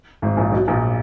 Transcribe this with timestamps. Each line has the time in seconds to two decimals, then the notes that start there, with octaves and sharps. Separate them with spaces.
0.22 G#1 G#2
0.37 A#1 A#2
0.52 B1 B2
0.68 A#1 A#2